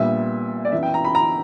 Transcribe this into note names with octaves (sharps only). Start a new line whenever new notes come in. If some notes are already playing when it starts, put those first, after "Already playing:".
Already playing: A#1 A#2 G3 B3 E5
D5
F#2 E3 B3 E5
G5
A#5
B5
A#5